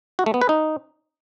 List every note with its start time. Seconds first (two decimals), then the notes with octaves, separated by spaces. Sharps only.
0.19 F#4
0.26 A3
0.34 B3
0.41 B4
0.49 D#4